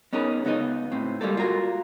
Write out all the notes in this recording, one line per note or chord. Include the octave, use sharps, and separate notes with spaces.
B3 C#4 D#4 G#4 A#4
C#2 B3 D#4 D#5
A2 C4
G3 G#3 A#3 A4
F4 F#4 A#4